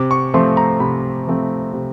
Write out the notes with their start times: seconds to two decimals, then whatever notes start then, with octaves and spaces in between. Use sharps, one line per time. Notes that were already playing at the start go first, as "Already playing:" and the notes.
Already playing: C3 D6
0.11 C#6
0.34 F3 A3 C4 C6
0.57 A#5
0.80 C3 B5
1.27 F3 A3 C4
1.73 C3